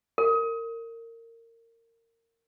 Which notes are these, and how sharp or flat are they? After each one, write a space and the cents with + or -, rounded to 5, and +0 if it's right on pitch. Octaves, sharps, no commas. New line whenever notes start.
A#4 -25